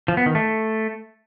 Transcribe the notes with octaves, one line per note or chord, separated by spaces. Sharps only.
F3
B3
D#3
A3